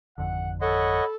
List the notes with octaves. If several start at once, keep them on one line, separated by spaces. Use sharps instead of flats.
G#1 F2 D3 F#5
A4 C#5 D#5 F#5 B5